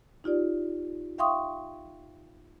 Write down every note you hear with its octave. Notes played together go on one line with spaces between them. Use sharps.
D#4 F4 G4 D5
E5 F5 G5 C6 C#6 D#6